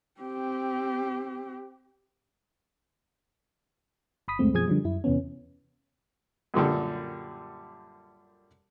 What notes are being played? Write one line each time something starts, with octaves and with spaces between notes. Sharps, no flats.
C4 G4
G1 B5 D#6 B6
C#2 F#2 G#3 A3 C4
F#2 B2 F3 G#4 D#6 G#6
D3 F3 G3
F#2 E4
E2 C3 E3 B3 C#4
F#2 A#2 D3 G3